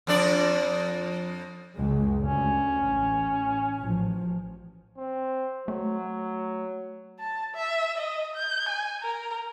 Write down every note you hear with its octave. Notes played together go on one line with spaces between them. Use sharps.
F2 D4 D5
C#2 F#2 G#3
D2 C#4
A1
A1 F3
C4
F#3 A3
A5
E5
D#5
G6
G#5
A#4